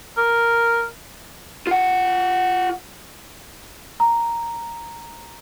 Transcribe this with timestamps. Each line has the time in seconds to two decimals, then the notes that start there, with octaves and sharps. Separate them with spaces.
0.17 A#4
1.67 F4 F#5
4.00 A#5